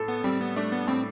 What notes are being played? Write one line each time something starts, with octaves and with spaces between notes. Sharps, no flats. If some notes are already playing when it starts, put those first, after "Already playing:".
Already playing: A2 A4
B3
G3 C4
B3
A3 D4
B3
A2 C4